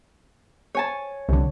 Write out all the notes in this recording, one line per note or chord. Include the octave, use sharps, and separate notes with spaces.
C#5 G#5 A5
C2 D3